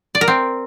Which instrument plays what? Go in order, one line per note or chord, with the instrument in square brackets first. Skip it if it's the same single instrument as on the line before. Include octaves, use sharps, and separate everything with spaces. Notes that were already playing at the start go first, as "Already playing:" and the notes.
[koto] D5
A#4
C4